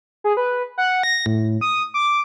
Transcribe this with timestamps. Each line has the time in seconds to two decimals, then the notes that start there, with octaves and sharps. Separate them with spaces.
0.24 G#4
0.37 B4
0.78 F#5
1.03 A#6
1.26 A2
1.61 D#6
1.94 D6